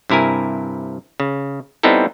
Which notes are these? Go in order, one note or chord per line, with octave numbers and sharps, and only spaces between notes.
G2 C3 E4 A#4 G#5
C#3
G3 B3 C4 D#4 E4 A4